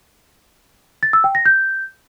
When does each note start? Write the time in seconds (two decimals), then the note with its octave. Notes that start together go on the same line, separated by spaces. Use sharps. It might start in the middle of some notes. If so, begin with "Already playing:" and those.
1.03 A6
1.13 E6
1.24 G5
1.35 A#6
1.46 G6